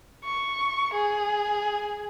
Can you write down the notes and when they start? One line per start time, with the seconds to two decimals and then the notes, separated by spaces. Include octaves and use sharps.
0.24 C#6
0.94 G#4